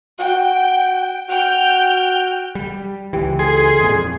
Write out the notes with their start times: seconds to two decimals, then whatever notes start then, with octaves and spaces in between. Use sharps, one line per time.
0.19 F#4 G5
1.29 F#4 G5 F6 G6
2.55 G3
3.13 C#2 E3 G4 G5
3.39 G#4 A4 C6
3.81 F2 A#2